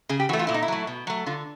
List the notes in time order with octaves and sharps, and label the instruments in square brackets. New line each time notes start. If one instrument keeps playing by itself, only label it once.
[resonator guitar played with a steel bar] C#3 G#4
G4
E3 F#4
A3
F4
A#2 E4
D#4
E4
F#3 A3
B2
F#3 A3
D3 F4